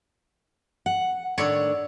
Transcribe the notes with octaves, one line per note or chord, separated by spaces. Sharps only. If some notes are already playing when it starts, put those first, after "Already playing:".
F#5
A2 D#3 D4 C#5 D5 E5